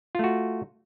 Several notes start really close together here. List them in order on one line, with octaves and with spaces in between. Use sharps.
F4 A3 F#4